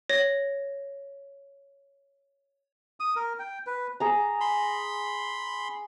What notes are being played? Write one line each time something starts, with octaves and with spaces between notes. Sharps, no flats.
C#5 A#6
D#6
A#4
G5
B4
G#4 A#5
B5 C6